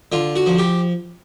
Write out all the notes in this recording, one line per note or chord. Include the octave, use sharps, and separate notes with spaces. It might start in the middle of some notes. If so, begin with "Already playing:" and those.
D3 F4
F#4
F3
G4